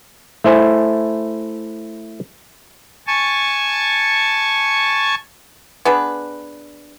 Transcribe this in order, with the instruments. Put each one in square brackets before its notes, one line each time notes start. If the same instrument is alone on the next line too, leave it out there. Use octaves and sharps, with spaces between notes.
[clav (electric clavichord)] A3 E4 C5 G#5
[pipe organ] G#5 A5 C#6
[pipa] B3 D4 G#4 B4